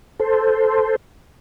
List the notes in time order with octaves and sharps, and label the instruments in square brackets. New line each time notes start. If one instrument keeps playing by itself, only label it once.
[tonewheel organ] A4 C5